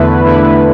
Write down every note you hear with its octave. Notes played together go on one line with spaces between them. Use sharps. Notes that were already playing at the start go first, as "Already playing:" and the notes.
Already playing: E2 D3 A3 E4 B4
E2 D3 A3 E4 B4